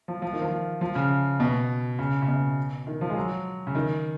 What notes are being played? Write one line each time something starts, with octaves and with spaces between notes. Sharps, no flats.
F3
F3
D#3
F3
F3
C#3
B2
C#3
C#3
B2
D#3
F3
G#3
F#3
C#3
D#3